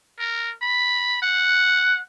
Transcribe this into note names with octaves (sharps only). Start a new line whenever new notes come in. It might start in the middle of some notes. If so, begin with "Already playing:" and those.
A#4
B5
F#5